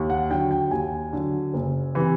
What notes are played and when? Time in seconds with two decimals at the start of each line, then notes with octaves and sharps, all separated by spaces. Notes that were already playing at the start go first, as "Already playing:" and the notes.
Already playing: D#2
0.10 F#5
0.30 D3 F#3 G5
0.51 G5
0.71 D#2 G#5
1.13 D3 F#3
1.54 F#1
1.95 C3 E3